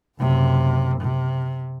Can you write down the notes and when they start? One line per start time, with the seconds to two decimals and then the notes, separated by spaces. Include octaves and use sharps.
0.19 F#1 C3
1.01 C3